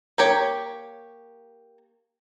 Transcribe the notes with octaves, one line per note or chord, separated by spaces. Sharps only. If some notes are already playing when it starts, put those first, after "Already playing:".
A#3 G4 C#5